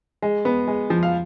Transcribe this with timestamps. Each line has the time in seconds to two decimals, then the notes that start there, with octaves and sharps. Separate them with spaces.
0.22 G#3
0.45 B3
0.67 G#3
0.90 F3
1.03 F5